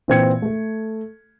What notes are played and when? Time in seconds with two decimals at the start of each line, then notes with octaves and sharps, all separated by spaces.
0.08 A#2 E3 C4 G5 G#6 C#7
0.42 A3 A4